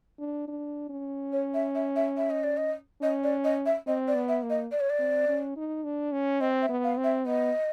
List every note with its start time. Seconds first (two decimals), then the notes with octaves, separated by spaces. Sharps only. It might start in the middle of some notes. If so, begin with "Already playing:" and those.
0.20 D4
0.48 D4
0.90 C#4
1.32 C#5
1.54 E5
1.75 E5
1.96 E5
2.17 E5
2.30 D#5
2.44 D5
2.57 D#5
3.02 C#4 D#5
3.23 D5
3.44 D#5
3.66 E5
3.87 C4 D#5
4.08 D5
4.15 B3
4.28 E5
4.43 A#3
4.50 D#5
4.72 D5
4.80 C#5
4.90 D5
4.99 C4
5.28 C#4
5.57 D#4
5.84 D4
6.12 C#4
6.40 C4 D#5
6.62 E5
6.69 B3
6.84 F5
6.98 C4
7.04 E5
7.26 B3 D#5